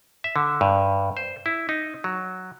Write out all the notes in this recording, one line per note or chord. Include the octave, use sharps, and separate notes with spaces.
E5
D3
G2
C5
E4
D#4
F#3